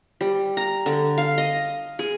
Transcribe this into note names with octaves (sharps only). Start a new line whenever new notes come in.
G3
A#5
D3
F5
D#5
G#4